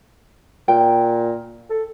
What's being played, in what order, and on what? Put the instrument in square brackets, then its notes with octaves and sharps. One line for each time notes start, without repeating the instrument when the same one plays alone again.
[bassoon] A#2 [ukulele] G5
[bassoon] A4